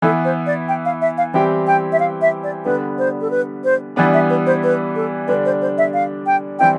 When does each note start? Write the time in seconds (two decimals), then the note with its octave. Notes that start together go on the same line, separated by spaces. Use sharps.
0.02 E3 B3 E4 A4
0.25 C5
0.46 D5
0.68 G5
0.85 F5
1.01 E5
1.17 F5
1.34 E3 G3 C4 E4 G4 G5
1.67 G5
1.92 E5
2.00 F5
2.22 E5
2.43 D5
2.65 D3 G3 B3 B4
2.98 C5
3.21 A4
3.31 B4
3.64 C5
3.96 E3 G3 B3 D4 D5
4.13 E5
4.30 B4
4.46 C5
4.63 B4
4.95 A4
5.28 D3 G3 D4 B4
5.45 C5
5.61 C5
5.78 E5
5.93 F5
6.26 G5
6.59 E3 G3 C4 E4 G5